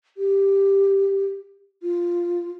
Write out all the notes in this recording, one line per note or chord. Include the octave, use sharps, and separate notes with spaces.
G4
F4